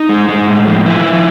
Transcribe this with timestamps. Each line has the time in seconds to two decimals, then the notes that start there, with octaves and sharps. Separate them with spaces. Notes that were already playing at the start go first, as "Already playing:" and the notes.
Already playing: D#4
0.09 G#3
0.29 G#3
0.48 A2
0.67 F3
0.86 F3 E4
1.05 F3